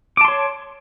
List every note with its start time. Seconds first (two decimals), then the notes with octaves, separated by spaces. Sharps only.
0.17 D6
0.21 A5
0.25 C6
0.28 C#5